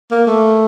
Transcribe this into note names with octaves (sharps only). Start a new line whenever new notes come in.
A#3
A3